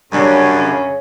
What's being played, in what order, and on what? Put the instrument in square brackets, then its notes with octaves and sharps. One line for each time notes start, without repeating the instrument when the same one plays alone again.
[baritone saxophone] F#2 [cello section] C#3 [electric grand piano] F#3 G3 D4 [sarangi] C#4